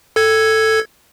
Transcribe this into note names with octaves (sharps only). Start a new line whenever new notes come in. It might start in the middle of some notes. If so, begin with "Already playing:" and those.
A4 G#6